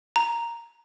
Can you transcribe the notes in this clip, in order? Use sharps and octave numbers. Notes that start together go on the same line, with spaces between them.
A#5